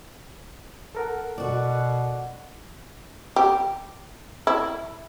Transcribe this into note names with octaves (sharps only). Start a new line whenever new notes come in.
A4 A#4 F#5
B2 F#4 D5
G4
E4